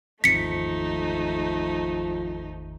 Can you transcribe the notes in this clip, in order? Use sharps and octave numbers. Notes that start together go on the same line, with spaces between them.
G#1 E2 F3 A3 D#4 B6 C#7